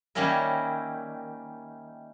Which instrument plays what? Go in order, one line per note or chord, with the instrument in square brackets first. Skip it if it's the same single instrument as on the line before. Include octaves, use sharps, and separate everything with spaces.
[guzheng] D#3 G3 A#3 C#4 E4 A#4